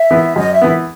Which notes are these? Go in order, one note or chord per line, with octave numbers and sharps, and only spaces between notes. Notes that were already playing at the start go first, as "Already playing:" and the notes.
Already playing: E5
E3 B3
F#2 D#5
E5
E3 B3